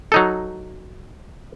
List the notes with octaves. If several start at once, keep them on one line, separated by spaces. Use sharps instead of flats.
F#3 D#4 A4